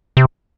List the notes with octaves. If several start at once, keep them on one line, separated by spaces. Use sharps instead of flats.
C3